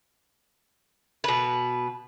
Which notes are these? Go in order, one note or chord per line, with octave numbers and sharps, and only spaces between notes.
B2 B4